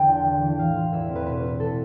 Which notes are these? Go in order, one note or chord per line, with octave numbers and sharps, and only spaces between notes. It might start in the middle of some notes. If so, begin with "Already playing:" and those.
Already playing: E2 D3 G5 A5
F4
E3
E3
A2 F5
F4
E2 E5
C4
B4
B2 B4
E4
A4